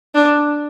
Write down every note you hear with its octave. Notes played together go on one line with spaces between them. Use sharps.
D4